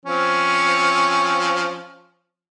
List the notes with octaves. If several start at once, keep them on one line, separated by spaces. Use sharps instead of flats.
F3 C4 C#4